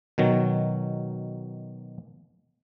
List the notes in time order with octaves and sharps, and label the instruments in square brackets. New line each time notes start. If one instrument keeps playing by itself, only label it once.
[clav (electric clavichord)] B2 D#3 F#3